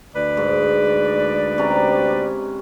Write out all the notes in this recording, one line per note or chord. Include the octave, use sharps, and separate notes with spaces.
D2 B4 D5
G#2
C3 C#4 A#5